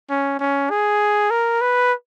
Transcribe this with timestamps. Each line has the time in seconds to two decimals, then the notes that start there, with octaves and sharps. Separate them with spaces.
0.10 C#4
0.39 C#4
0.70 G#4
1.31 A#4
1.61 B4